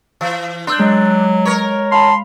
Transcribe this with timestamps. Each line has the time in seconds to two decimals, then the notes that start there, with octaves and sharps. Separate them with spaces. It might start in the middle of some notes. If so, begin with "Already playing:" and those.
0.21 E3
0.67 D4 C6 E6 G6
0.79 F#3 G#3
1.45 A#4 C#5
1.92 F5 A5 B5 C6